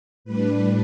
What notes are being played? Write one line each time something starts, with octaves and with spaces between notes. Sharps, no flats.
A2 G3 D4 B4